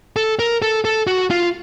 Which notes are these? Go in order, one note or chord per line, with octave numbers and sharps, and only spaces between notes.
A4
A#4
A4
A4
F#4
F4